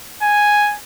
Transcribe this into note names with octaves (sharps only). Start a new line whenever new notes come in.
G#5